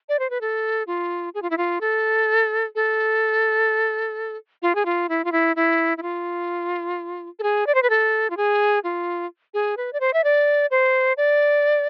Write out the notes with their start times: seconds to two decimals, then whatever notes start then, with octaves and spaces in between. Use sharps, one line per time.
0.09 D5
0.19 C5
0.30 B4
0.41 A4
0.87 F4
1.34 G#4
1.42 F4
1.50 E4
1.58 F4
1.81 A4
2.75 A4
4.62 F4
4.75 G#4
4.86 F4
5.09 E4
5.24 F4
5.32 E4
5.56 E4
5.98 E4
6.02 F4
7.39 A4
7.43 G#4
7.67 D5
7.75 C5
7.83 B4
7.90 A4
8.30 F4
8.37 G#4
8.84 F4
9.54 G#4
9.77 B4
9.93 D5
10.00 C5
10.14 E5
10.24 D5
10.71 C5
11.17 D5